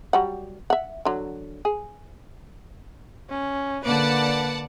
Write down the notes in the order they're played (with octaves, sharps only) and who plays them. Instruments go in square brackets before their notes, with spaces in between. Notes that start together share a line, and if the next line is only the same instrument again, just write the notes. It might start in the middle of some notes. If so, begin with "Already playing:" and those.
[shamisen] F#3 G3 F#5
E5 F#5
D3 F#3
G#4
[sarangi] C#4
[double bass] D3 A#3 [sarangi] B4 [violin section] D5 F#5 A5